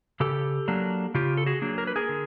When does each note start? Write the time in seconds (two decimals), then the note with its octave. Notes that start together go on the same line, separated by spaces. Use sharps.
0.20 C#3 G4 A4
0.68 F#3 A#3 D4
1.14 C#3 F4 G4
1.37 A4
1.46 F#4 G#4
1.62 F#3 A#3 D4
1.78 A#4
1.87 B4
1.96 G#4 A#4
2.09 D3